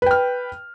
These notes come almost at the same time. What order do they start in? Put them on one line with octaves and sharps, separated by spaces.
B4 G5 F6